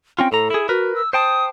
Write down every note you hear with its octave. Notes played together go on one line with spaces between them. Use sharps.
C4 C#4 F4 G5
A2 A4 A#5
E4 G#4
F#4 A#4 B4
E6
C5 G5 A5 D#6